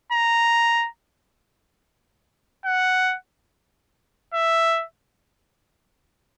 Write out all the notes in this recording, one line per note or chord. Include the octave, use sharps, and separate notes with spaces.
A#5
F#5
E5